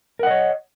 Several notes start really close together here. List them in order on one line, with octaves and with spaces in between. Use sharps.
A#4 F#5 D#5 C#5